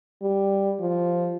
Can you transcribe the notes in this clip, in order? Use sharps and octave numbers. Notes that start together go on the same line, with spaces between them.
G3
F3